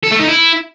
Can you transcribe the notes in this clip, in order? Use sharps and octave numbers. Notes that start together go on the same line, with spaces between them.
A4
A3
D#4
E4